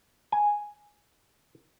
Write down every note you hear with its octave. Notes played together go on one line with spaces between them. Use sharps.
G#5